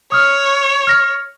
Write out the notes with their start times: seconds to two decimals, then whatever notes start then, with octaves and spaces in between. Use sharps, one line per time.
0.12 C#5 D#6 F6
0.87 F6 A#6